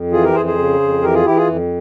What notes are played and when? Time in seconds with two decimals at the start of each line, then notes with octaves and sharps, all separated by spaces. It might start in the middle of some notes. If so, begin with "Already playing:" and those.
Already playing: F2
0.11 E3 F4 G#4
0.23 G4 A#4
0.34 F2 G#4 C5
0.45 G#4 C5
0.58 C#3
0.80 F2
1.02 E3 G4 A#4
1.14 F4 G#4
1.25 E3 E4 G4
1.36 F4 G#4
1.48 F2